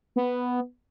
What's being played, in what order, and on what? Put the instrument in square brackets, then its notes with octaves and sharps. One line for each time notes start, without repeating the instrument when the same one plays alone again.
[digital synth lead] B3